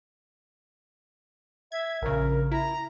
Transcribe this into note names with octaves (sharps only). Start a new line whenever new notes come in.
E5 G#6
A#1 C#3 A#4
E4 A#5